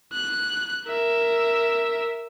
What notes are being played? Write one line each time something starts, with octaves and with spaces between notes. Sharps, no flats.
F#6
A#4 E5